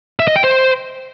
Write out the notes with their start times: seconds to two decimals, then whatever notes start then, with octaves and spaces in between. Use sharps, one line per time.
0.20 E5
0.28 D#5
0.36 G5
0.44 C5